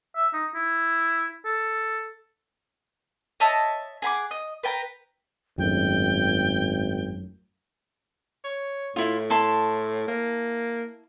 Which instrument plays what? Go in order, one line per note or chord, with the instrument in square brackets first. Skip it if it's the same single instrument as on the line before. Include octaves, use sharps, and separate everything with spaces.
[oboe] E5
D#4
E4
A4
[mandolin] C#5 D#5 E5 A5
G#4 F#5 B5 D6
D#5
B4 G5 G#5 A#5
[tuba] G#1 [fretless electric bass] F#2 A2 [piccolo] G5
[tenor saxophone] C#5
[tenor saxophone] A2 [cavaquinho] E4 F4
[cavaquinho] E4 A5 C6
[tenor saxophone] A#3